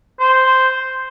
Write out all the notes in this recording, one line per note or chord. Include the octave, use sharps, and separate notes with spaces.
C5